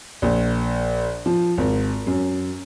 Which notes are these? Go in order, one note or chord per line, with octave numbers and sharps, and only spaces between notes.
A#1
F3
G#1
F#2